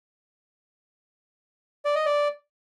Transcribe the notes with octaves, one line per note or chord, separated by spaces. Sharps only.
D5
D#5
D5